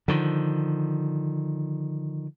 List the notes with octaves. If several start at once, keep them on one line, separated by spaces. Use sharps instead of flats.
D3 D#3 F3